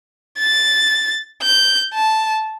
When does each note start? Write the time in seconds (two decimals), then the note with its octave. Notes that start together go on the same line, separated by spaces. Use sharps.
0.39 A6
1.42 G6
1.94 A5